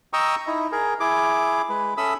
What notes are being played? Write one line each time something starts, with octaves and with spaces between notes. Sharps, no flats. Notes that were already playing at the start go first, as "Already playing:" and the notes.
D#5 G5 A#5 C#6 D#6 E6
D#4 E4
G#4 A#4
E4 G#4 D6
G#3 B4
C#4 A4 E5 B5 D#6 E6